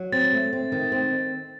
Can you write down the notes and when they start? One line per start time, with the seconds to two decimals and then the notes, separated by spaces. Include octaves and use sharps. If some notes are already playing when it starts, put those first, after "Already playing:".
Already playing: F#3
0.12 C4 A6
0.33 A3
0.53 C4
0.72 D#3
0.92 C4